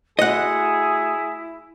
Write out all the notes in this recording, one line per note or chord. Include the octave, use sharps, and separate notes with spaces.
A3 E4 F#4 G#4 D#5 F#5 C#7